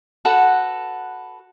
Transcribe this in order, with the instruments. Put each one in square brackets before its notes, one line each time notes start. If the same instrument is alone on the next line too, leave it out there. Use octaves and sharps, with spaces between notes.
[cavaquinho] F#4 A4 B4 F#5